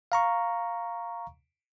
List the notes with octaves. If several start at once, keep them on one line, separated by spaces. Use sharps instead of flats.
F5 A#5 C#6